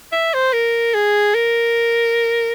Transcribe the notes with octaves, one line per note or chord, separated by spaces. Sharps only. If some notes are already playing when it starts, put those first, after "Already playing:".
E5
C5
A#4
G#4
A#4